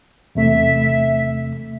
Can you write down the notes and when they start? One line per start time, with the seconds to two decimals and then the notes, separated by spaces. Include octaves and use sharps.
0.35 E2 C3 A3 E5